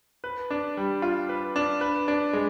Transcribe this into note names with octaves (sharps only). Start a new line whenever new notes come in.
B4
D4
G3
F4
B4
D4
B4
D4
G#3